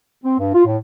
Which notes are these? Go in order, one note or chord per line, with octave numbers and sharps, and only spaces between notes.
C4
G2
F4
A2